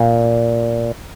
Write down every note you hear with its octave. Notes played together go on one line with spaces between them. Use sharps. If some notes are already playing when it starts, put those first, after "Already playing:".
Already playing: A#2